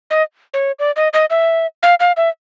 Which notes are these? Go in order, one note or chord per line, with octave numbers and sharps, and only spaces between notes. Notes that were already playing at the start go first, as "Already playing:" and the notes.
D#5
C#5
D5
D#5
D#5
E5
F5
F5
E5